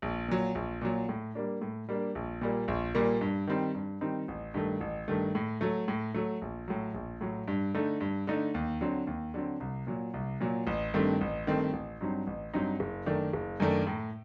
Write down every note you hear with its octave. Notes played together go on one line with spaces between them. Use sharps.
A#1
A#2 F#3
A#1
A#2 F#3
A2
G3 A#3 D4
A2
G3 A#3 D4
A#1
A#2 G3 A#3
A#1
A#2 G3 A#3
G2
D#3 G3 C4 D#4
G2
D#3 G3 C4 D#4
A1
G2 D#3 A3
A1
G2 D#3 A3
A2
F#3 A3
A2
F#3 A3
A#1
A2 F#3
A#1
A2 F#3
G2
D3 A3 D#4
G2
D3 A3 D#4
D#2
D3 F#3 C4
D#2
D3 F#3 C4
C2
A#2 F#3
C2
A#2 F#3
A1
G2 D#3 A3 C4
A1
G2 D#3 A3 C4
A1
G2 F#3 C4 D#4
A1
G2 F#3 C4 D#4
F#1
F#2 D#3 A3 D4
F#1
F#2 D#3 A3 D4
A2